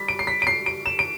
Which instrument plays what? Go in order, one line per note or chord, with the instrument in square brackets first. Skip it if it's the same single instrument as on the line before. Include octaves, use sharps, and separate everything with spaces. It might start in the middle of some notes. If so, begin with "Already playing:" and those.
Already playing: [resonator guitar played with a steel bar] G3 [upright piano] B6
[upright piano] D7
C7
B6
D7
C7
D7
E7
D7